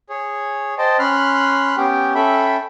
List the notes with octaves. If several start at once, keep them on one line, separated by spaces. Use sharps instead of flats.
G#4 C#5
C5 D#5 G5 A5
C#4 B5 C6 F6 F#6
B3 C#4 G4 G5
C#4 A4 E5 G5 B5